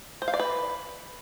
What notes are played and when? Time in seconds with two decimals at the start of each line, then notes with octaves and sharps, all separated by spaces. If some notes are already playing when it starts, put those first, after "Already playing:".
0.22 C5
0.28 F5
0.34 D5
0.40 B4